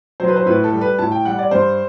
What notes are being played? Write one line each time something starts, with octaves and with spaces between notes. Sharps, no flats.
F#3 C5
B4
C5
A2 B4
A4
G3
B4
A2 A5
G5
G3 F#5
D5
G2 C5